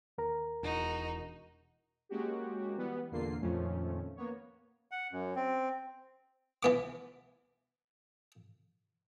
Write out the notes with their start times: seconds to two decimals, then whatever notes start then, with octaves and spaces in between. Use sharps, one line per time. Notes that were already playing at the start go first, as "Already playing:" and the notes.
0.18 D#2 A#4 A#5
0.63 E1 D#4 F#4
2.09 G#3 A#3 C#4 F#4 G4
2.76 E3 G3 B3
3.11 E2 A#2 D3 A#3 F4 C7
3.41 F2 A#2 D#3 F3 A3 C#4
4.16 A#3 B3 C#5
4.91 F#5
5.12 F#2
5.35 C4
6.63 E3 B3 D6